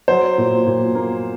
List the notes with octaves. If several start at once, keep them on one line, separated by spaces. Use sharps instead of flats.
F#3 C5
A#2
A#2
A#3